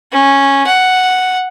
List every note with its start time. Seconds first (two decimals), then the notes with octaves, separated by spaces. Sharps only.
0.12 C#4
0.67 F#5